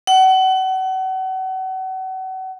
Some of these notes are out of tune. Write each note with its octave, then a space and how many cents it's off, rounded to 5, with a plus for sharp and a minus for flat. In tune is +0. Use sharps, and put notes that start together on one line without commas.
F#5 +35